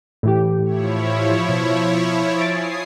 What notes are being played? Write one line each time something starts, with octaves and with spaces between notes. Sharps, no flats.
A2 E3 G4
F3 E4 C#5
B2
G#5 D#6 A6 C7 D7